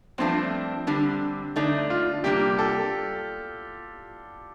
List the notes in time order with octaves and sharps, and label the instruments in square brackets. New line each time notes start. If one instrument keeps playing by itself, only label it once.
[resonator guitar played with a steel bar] G2 F3 A3 D4 [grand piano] C4
[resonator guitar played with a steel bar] D3 G3 D4
[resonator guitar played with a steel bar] D3 A3 D#4 [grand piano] D4
[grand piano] F4
[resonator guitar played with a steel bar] C3 G3 A#3 D4 [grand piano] G4
[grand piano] A4